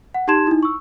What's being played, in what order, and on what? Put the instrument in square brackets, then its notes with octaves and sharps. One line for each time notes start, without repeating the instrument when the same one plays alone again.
[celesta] F#5
D#4 G4 A5 C6 G#6 E7
D#4 E4
C#6 E6